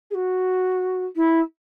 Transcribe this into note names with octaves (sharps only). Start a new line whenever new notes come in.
G#4
F#4
E4